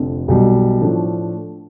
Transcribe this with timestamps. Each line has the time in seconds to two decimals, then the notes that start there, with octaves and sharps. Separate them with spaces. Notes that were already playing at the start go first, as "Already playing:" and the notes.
Already playing: F1 F2 D3
0.28 B1 B2 G3
0.81 A2 F3 A3 D4